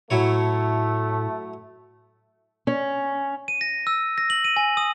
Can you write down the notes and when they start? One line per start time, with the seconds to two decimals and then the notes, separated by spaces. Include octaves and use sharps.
0.10 A2 F#3 A3 E4 C#5
2.67 C#4
3.48 D#7
3.61 A#6
3.87 E6
4.18 A#6
4.30 F#7
4.44 D#7
4.57 G#5
4.77 D#6